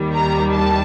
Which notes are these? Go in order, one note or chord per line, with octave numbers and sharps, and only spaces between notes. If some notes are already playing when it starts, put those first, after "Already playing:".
Already playing: D#2 D#3 G3
A#5
A5